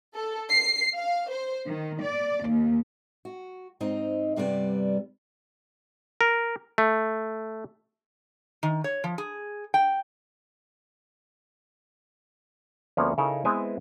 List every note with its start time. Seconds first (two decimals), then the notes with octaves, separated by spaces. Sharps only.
0.15 A4
0.50 C7
0.95 F5
1.30 C5
1.68 D#3
2.03 D5
2.49 D#2
3.25 F#4
3.80 G#2 C4 D#4 D#5 A#5
4.36 G2 C3 G3 B3 G#4 D5
6.21 A#4
6.78 A3
8.63 D#3
8.84 C#5
9.04 F3
9.18 G#4
9.74 G5
12.97 D2 F3 A#3 B3 C#4
13.18 C#3 C#4 D#4 E4 A4 A#4
13.45 G#3 B3 C4 E4 B4 G#5